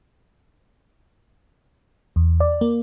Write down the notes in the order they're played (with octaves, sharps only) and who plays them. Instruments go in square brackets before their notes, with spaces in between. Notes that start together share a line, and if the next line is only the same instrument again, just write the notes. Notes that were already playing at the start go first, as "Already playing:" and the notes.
[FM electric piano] E2
D5
A#3